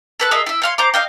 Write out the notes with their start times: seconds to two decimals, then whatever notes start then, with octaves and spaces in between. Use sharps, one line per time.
0.20 A4 B4 F#6
0.31 G#4 A#4 D#5 E5
0.46 E4 E5
0.62 C#5 F5 C6
0.78 C5 A#5 D6
0.94 D#5 F5 G5